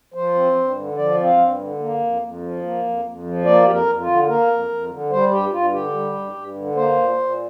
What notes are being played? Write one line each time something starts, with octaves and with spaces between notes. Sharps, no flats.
F3 C5
C4
G2
D3
F3 D5
C4
F5
G2
D3
A#3
F2
F2
F3
A#3
F2
F2
F3
A#3 D5
F2 G4
A#4
F2
F4
D3
A#3 A#4
F2
F2
D3
G3 C5
G2 G4
G2 F4
D3 G4
G3
G2
G2
D3
A#3 C5
A#2
A#2